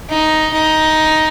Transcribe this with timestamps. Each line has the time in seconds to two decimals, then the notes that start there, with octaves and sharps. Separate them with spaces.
0.09 D#4
0.54 D#4